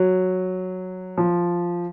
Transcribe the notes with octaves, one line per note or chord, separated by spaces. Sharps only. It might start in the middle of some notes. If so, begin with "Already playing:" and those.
Already playing: F#3
F3